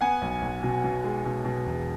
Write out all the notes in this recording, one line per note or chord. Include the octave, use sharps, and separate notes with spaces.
B3 F#5 G#5
B1
B1
B2
B2
G#3
B2
B2
E1